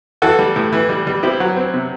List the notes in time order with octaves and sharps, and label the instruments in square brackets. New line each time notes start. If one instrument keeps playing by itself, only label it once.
[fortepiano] E3 F#4 A4
G3
A2
E3
G3
G3
C4 E4 G4
F#3
C4
C3